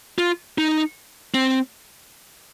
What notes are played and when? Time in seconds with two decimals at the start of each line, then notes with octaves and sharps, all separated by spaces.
0.18 F4
0.58 D#4
1.34 C4